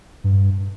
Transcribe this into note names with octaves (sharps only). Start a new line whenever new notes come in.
G2